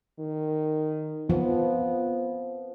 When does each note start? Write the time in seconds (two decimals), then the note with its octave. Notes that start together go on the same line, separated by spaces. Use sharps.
0.19 D#3
1.30 F3 B3